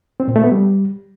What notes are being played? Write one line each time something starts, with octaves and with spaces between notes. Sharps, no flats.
C4
A#2
A3
B3
G3